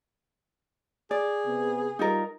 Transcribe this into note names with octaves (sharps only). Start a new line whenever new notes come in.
G#4 D5
C3 B3
G3 D#4 F4 A#4